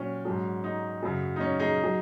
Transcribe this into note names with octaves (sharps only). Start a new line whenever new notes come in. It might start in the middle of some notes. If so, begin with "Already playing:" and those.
Already playing: A#2 F#3 C#4
G#2 F#3
D#4
F#2 C#3 F#3
D#4
C#4
D#4 G#4
F#3